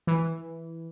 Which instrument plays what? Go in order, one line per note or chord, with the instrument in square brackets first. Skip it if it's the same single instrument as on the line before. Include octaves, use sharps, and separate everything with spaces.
[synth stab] E3